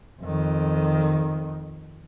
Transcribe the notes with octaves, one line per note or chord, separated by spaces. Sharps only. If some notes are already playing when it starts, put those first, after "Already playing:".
F2 D#3